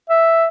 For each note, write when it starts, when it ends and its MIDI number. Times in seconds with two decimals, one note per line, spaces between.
0.10 0.48 76